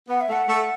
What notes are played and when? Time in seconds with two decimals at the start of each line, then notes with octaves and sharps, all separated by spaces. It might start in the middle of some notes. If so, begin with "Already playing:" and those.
0.09 B3 F#5
0.21 E5
0.29 A3 F#5
0.49 A3